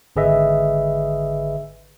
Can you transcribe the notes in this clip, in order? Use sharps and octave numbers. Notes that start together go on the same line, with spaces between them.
G#1 D3 G#4 B4 D#5 E5